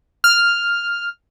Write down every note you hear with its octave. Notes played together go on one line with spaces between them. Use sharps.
F6